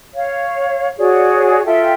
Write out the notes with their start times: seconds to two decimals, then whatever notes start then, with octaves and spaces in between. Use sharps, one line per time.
0.15 C#5 F5
0.98 F#4 G#4 C#5 D5
1.65 F4 A4 E5 G5